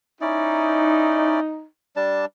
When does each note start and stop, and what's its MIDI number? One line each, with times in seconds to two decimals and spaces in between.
0.21 1.40 61
0.21 1.65 63
0.21 1.40 64
0.21 1.40 74
1.96 2.25 55
1.96 2.25 62
1.96 2.25 81